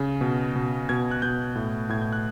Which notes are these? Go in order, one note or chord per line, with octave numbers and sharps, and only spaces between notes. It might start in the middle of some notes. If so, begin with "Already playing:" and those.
Already playing: C#3
B2
B2
B2 G#6
F#6
B2 G6
A2
A2 G#6
G6
F#6